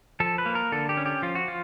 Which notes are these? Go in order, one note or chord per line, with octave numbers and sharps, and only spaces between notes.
F3 A4
B4
A#3
A#4
D3 A4
G4
C#4
G4
F3 F4
F#4
F4